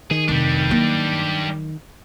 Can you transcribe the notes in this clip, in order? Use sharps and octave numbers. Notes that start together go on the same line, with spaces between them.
D#3 G#4
F1 G3 D4
F#3 A#3